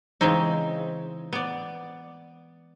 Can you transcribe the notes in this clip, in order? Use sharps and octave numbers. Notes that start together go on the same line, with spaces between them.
C#3 E3 G#3 C4 D#4
B3 D5